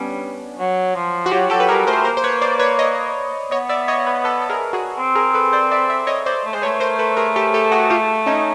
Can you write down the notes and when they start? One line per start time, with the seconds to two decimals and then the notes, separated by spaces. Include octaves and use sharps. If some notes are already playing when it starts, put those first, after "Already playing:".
Already playing: G3 B3 C#4 D4
0.59 F#3
0.95 F3
1.26 F#4
1.31 F#3 F4 G4
1.50 F#3 G4 A4
1.60 B4
1.69 G3 G#4 A#4
1.87 A3 A#4 C5
2.05 A#3 A#4 C5
2.17 C5
2.24 B4 C#5
2.42 C5 D5
2.59 B4 C#5
2.79 C#5 D#5
3.51 B3 C#5 D#5
3.69 D5 E5
3.88 C#5 D#5
4.07 B4 C#5
4.24 A4 B4
4.42 A4
4.50 G#4 A#4
4.73 F#4 G#4
4.98 C4
5.15 G#4 A#4
5.34 A4 B4
5.53 C5 D5
5.72 D5 E5
5.90 D5 E5
6.07 C#5 D#5
6.26 C5 D5
6.45 A3
6.53 G#3 C5
6.62 A3 B4 C#5
6.80 A#4 C5
6.99 A4 B4
7.17 G#4 A#4
7.36 G4 A4
7.54 G4 A4
7.72 F#4 G#4
7.90 F4 G4
8.26 C#4 D#4